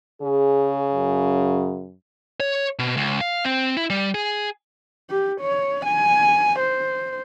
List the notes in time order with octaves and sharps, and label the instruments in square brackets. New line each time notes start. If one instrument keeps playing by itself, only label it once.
[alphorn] C#3 [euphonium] G#4
[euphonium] F#2
[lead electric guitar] C#5
B2
C#2
F5
C4
E4
G3
G#4
[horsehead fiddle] G4
C#5
G#5
C5